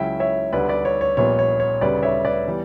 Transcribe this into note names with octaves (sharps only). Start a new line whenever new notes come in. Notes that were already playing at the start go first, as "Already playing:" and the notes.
Already playing: C#2 C#3 F#3 C#4 E4 E5 G5
C#5 E5
D2 D3 G3 B4 D5
B4 D5
C#5
C#5
A#1 A#2 G3 B3 C#5
C#5
C#5
D2 C#3 G3 B4 D5
C#5 E5
B4 D5
E3 G3 B3